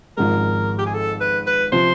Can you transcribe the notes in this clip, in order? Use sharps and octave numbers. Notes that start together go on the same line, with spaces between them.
G#1 G#2 F3 G#3 A#4
G4
G#4
A4
B4
B4
C3 F3 C5